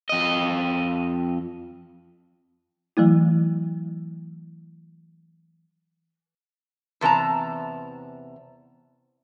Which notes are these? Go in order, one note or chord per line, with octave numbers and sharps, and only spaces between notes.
F2 D#5
E3 F#3 A3 E4
E2 C3 A#4 A5 A#5